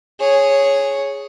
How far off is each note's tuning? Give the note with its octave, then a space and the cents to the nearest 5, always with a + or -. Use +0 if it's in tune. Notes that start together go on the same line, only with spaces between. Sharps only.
G#4 +0 C#5 +0